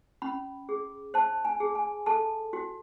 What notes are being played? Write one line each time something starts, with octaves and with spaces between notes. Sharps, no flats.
C#4 B5
G#4
C5 A5
G#5
G#4
G#5
A4 A5
F#4